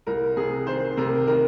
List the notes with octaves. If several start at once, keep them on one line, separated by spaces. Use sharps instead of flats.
C2 A#4
C3 G#4
D#3 C5
C3 A#4
D#3 A#4